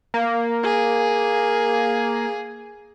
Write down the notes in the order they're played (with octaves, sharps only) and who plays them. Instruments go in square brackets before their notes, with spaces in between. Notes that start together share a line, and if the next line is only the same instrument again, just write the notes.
[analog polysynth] A#3
[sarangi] G#4